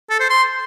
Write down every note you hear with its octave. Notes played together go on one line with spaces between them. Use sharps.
A4
C5
C6